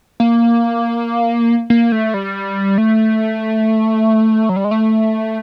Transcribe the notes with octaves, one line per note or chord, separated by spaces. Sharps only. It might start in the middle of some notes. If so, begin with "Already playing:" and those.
A#3
A#3
A3
G3
A3
F#3
G3
G#3
A3